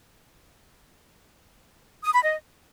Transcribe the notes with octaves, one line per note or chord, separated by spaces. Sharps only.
D#6
B5
D#5